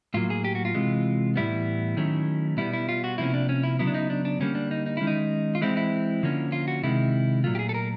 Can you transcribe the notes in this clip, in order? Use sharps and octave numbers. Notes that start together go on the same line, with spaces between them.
A2 F#3 A#3 F4
G#4
G4
F#4
F4
C3 E3 G#3
A2 E3 G3 B3 E4
D#3 F#3 A3 C#4
B2 G3 B3 E4
E4
F4
F#4
C3 F3 A#3 C#4 E4
D4
C#4
E4
C#3 F#3 B3 E4
D4
D#4
D4
D4
D3 G3 A#3 C#4
D4
D#4
D#4
D#3 G#3 C#4 E4
D#4
F4
E3 G#3 C4 E4
E4
D3 F3 A#3 C#4
F4
F#4
C3 D#3 G#3 E4
A#2 F#3 A3 F4
G4
G#4
A4
A#4